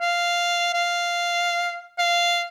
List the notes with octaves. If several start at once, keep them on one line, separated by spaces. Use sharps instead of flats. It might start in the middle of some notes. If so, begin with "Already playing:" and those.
F5
F5
F5